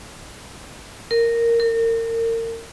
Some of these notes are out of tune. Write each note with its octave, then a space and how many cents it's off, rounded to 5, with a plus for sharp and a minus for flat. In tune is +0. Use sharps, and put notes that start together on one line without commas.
A#4 -5
A#4 -35